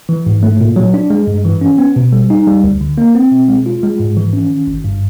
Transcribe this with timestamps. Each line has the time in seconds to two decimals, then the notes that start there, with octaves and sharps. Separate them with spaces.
0.09 E3
0.26 G#2
0.43 A3
0.61 A#2
0.76 F#3
0.94 D4
1.10 G#3
1.27 G2
1.45 E3
1.61 C#4
1.78 B3
1.96 B2
2.12 G3
2.30 D#4
2.47 G3
2.64 D2
2.81 D3
2.98 A#3
3.15 C4
3.32 B2
3.48 G#3
3.66 F4
3.83 G#3
4.00 G#2
4.17 E3
4.33 C#4
4.50 D#3
4.67 G1
4.84 G2